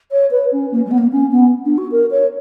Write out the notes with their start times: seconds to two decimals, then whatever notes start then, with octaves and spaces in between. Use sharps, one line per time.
0.11 C#5
0.31 B4
0.52 C#4
0.72 A#3
0.85 G3
0.91 B3
0.98 A#3
1.12 C#4
1.31 B3
1.65 D4
1.78 F#4
1.92 A#4
2.11 C#5